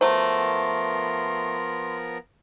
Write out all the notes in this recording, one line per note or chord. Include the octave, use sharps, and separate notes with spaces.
F3 F#3 A3 B3 A#4 C5 C6